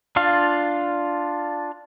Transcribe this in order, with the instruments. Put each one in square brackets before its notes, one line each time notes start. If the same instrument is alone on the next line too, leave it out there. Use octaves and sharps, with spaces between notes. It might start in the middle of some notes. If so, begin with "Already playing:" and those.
[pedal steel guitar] D4 F4 F5